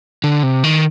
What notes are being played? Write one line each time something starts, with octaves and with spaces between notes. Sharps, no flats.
D3
C3
D#3